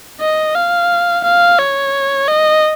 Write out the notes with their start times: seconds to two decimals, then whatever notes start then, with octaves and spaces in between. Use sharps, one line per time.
0.20 D#5
0.55 F5
1.24 F5
1.58 C#5
2.27 D#5